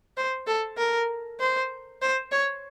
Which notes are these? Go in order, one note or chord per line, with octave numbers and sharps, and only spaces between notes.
C5
A4
A#4
C5
C5
C#5